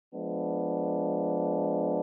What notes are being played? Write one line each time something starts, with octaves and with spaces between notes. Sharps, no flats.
F3 G#3 B3 D4